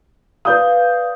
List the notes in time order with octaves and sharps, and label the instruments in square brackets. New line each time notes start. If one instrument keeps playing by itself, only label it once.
[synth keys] B4 D5 F5 [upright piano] D#6 G6